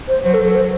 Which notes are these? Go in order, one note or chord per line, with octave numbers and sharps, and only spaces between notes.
C5
F#3 C5
A4
A4
C5